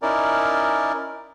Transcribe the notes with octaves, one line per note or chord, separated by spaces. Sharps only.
C#4 D#4 E4 A#4 D5